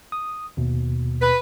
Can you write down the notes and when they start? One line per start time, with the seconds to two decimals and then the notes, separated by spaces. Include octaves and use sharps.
0.12 D#6
0.57 D#2 B2
1.22 B4